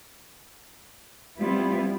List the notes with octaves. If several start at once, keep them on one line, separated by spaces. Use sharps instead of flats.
G3 B3 C4 E4 F4